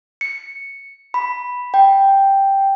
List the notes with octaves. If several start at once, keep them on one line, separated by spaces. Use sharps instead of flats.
C#7
B5
G5